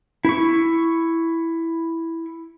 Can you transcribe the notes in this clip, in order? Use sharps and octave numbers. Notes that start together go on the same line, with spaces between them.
E4 C#6